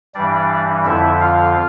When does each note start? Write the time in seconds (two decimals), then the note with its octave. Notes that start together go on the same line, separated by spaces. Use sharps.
0.14 G2 E3 G3 D4 D5
0.85 F2 D3 F3 E4 E5
1.20 F4 F5